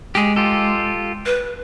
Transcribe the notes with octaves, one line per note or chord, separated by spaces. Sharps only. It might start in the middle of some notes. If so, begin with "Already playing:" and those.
G#3 G4 G#4
F4 G4 A4
B4